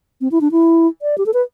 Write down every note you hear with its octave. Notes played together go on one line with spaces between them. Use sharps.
C4
E4
D4
E4
D5
G4
A4
B4